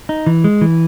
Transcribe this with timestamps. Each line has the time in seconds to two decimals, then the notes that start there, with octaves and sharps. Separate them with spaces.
0.09 D#4
0.27 E3
0.44 G#3
0.61 E3